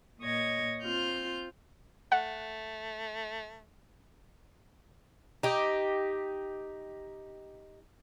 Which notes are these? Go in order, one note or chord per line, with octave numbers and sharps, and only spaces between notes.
A#2 C#5 D#5 G#6 A#6
C4 F4 F6 G6
A3 F#5
D#4 G4